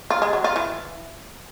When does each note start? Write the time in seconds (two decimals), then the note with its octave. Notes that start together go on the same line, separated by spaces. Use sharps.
0.10 F4
0.22 G#3
0.33 F#3
0.44 F4
0.56 E3